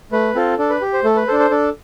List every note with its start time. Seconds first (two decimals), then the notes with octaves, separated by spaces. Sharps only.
0.12 A3 B4
0.35 C4 F4 A4
0.58 D4 A4
0.70 B4
0.81 G4
0.94 C5
1.04 A3 A4
1.16 B4
1.27 D4 A4 C5
1.39 C5
1.50 D4 A4